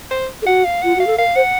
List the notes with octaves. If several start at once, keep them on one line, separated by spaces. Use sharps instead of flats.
C5
A4
F#4 F#5
F5
F4 F#5
F#4 F5
A4
A#4 F5
C5 F#5